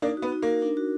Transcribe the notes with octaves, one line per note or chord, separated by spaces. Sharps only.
A#3 D4 D#4
F#4
B3
D#4
A#3 A#4
D4
F#4